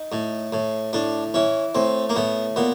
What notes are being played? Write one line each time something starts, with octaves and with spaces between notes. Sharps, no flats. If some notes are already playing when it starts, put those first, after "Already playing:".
Already playing: D#4
A2
A2
A2 D4
E3 C#4
A2 C4
A#3
A2 B3
A#2 B3